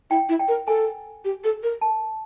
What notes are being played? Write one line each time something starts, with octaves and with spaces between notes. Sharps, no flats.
E4 G5
E4
G5
A#4
A4 G#5
G4
A4
A#4
A5